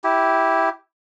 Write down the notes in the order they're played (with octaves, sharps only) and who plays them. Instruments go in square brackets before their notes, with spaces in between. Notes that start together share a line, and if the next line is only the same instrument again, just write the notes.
[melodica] E4 G4